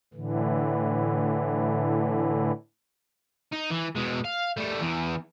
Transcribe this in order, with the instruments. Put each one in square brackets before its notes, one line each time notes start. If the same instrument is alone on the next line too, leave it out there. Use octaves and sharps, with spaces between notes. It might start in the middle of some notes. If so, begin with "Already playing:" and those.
[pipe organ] A2 D3 E3
[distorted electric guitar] D#4
E3
B2 G#3
F5
G3 A3
E2 E3